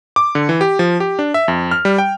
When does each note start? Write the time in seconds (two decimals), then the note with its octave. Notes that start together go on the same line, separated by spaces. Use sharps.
0.16 D6
0.35 D3
0.49 E3
0.61 G4
0.79 F3
1.00 G4
1.19 D4
1.34 E5
1.48 F2
1.71 F6
1.85 G3
1.98 G5